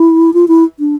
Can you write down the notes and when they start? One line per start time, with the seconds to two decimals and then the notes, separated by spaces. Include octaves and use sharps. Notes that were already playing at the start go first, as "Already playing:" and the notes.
Already playing: E4
0.34 F4
0.48 E4
0.79 D4